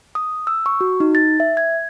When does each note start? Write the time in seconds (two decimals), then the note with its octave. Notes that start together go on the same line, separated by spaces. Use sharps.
0.15 D#6
0.47 E6
0.66 C#6
0.81 F#4
1.00 D#4
1.15 A6
1.40 E5
1.57 G#6